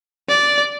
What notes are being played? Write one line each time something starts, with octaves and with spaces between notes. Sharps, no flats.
D5